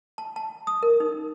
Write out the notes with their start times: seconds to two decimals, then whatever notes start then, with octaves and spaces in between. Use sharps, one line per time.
0.18 A5
0.36 A5
0.67 D#6
0.83 A#4
1.00 D#4